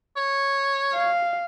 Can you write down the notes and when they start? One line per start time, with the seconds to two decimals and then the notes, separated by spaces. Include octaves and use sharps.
0.17 C#5
0.93 F5